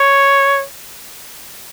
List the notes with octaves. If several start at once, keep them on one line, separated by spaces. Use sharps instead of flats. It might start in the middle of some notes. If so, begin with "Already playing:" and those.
Already playing: C#5